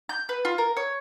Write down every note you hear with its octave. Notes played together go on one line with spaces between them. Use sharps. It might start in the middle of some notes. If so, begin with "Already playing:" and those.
G6
B4
F4
A#4
C#5